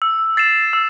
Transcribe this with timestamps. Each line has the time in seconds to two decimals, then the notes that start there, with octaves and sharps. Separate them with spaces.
0.02 E6
0.37 A6 C7 E7
0.73 E6